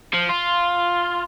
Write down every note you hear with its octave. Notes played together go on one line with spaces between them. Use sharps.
F3
F4